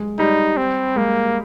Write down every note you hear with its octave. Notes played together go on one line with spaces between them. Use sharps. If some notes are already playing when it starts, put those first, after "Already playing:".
Already playing: G#3
G3 D#4
C4
G#3 A#3